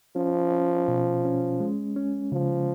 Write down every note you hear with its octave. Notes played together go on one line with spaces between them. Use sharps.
F3 C#4
C#4
B2
C#4
G#3
C#4
C#3 F3